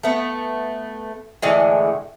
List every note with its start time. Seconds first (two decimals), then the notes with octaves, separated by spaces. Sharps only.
0.03 A3 B3
1.42 A2 D3 E3 G#3